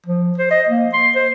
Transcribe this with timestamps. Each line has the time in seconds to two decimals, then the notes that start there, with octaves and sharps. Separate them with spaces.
0.06 F3
0.38 C5
0.51 D#5
0.68 A#3
0.93 C6
1.15 C5